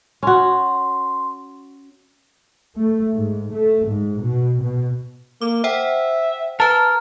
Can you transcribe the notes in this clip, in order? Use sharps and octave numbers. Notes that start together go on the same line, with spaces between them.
C#4 F#4 C6
A3
G#2
A3
G#2
B2
B2
A#3 D6
C5 E5 F#5 G5
A#4 B4 G#5 A5